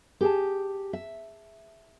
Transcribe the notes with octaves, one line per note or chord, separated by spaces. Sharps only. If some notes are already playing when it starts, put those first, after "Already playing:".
G4 G#4 A5
E5